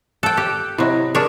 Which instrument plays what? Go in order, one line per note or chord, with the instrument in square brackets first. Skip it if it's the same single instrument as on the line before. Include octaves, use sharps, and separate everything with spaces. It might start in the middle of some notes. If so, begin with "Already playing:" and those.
[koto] A4 G5 [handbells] F#6
[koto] G4
[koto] C3 F#3 [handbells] E4 D#5
[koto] D4 C#5 [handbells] G#4 A#4 A5